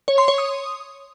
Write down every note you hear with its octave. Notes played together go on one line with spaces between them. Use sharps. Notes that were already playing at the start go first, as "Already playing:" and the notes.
C#5
C6
C#5
D#6